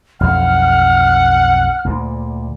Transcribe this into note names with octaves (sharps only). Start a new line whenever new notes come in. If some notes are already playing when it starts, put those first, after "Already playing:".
B1 F2 E3 F#5 F6
D2 A#2 D3